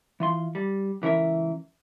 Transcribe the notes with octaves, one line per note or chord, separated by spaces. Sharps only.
E3 F4 C6
G3
C#2 E3 C#4 A#4 E5